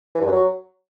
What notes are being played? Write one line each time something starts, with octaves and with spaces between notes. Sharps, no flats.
E3
G2
F#2
F#3